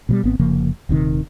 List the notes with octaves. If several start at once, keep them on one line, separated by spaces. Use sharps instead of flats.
B2 F#3 G3
G#1 B3 C4
F1 C#3 F3 A#3
D#1 C3 D#3